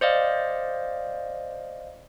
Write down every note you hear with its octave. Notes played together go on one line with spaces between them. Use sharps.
C5 D5 D#5 F5